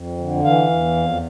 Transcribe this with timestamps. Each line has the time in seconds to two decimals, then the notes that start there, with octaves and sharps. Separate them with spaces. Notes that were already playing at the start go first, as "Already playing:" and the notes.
Already playing: F2
0.18 D3
0.44 E3 F5
0.70 E2
0.96 F2